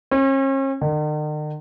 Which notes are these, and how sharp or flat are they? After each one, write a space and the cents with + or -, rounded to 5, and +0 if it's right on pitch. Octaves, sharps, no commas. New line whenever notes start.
C#4 -45
D#3 -45